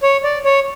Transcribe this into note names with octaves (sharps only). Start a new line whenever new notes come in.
C#5
D5
C#5